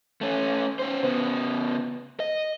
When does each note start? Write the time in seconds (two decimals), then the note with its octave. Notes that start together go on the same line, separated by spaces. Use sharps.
0.21 A3 C#4
0.79 C#4 C5
1.03 C#3 B3
2.20 D#5